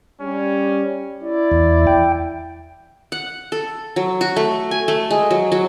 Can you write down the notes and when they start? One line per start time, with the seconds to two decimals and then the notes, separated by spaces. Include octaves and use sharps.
0.21 G3 C#4
1.23 E4 D5
1.51 E2
1.87 G5
3.12 F#5
3.52 A4
3.96 F#3
4.21 F#4
4.36 A3
4.71 G#5
4.88 A3
5.11 G#3
5.31 F#3
5.52 F#3